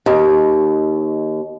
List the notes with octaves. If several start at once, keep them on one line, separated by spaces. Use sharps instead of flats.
D#2